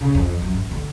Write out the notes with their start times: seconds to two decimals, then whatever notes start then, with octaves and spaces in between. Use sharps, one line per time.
0.01 C#3
0.15 F2
0.42 F#2
0.54 G2
0.71 D3